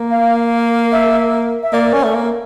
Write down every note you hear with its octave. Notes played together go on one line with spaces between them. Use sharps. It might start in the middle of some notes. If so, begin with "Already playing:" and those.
Already playing: A#3
F5
E5
E5
A#3 D5
C#4
A3
A#3